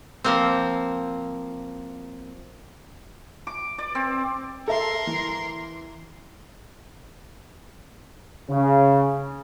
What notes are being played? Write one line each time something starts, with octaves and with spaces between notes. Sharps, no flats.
F3 A#3 C4
D6
D5
C4
A4 A#4 E5 C6
E3
C#3